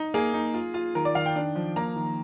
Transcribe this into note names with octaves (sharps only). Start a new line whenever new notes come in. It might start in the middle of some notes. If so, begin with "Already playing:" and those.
Already playing: D#4
A#3 G#4
D#4
F4
F4
D#3 A#4
D5
D#3 F5
G5
D4
F3
A#3 A#5
D#3